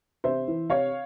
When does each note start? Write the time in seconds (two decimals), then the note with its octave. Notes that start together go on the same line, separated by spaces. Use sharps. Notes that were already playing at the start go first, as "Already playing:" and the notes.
0.24 C3 C5 E5
0.48 E3
0.69 C3 C#5 F5